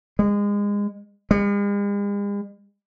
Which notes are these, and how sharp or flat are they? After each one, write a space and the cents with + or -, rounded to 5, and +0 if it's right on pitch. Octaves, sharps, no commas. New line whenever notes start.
G#3 -25
G#3 -45